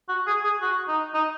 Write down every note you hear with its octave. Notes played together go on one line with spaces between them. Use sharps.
F#4
G#4
G#4
F#4
D#4
D#4